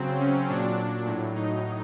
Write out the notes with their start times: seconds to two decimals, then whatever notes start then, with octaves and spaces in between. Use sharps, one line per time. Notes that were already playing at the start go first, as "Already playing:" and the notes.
Already playing: C#3 F#3 C4
0.19 C#4
0.49 A#2 F#3 D4
0.77 D4
1.06 A2 F#3
1.35 D#4